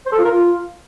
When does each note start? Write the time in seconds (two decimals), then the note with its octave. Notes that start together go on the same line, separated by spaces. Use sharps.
0.06 C5
0.12 A4
0.18 F4
0.25 A#4
0.31 F4